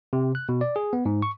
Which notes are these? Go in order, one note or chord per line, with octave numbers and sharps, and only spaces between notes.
C3
F#6
B2
D5
G#4
B3
G#2
C#6